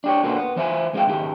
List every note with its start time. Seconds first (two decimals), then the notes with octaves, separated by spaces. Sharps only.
0.04 D4 G4 C#5
0.23 B2 D3 A#3 B3 C#4 F4
0.36 B3
0.56 E3 C5 E5 G#5
0.93 C#2 G#3 C4 C#5 F5 G5
1.07 C#2 G#2 D#3 G4